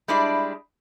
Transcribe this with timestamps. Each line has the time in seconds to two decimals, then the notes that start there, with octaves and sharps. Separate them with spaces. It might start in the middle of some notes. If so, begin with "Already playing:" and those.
0.08 G3 G#3 D4 E4 D5